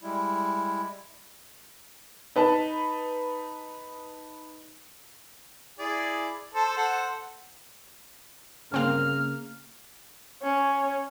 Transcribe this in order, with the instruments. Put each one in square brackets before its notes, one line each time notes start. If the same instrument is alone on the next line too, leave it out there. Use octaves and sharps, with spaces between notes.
[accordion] G3 G#3 E4
[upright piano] D#4 B4 A5
[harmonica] E4 G#4 D5
A4 C5 A5
A4 C5 F#5
[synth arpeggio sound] G1 C4 F5 [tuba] C#3 [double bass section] A#3 [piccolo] F6
[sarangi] C#4